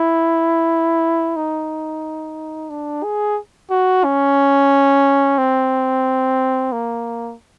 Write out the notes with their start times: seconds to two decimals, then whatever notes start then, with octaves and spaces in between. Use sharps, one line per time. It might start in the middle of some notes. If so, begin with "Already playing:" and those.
Already playing: E4
1.36 D#4
2.70 D4
3.04 G#4
3.71 F#4
4.04 C#4
5.38 C4
6.72 A#3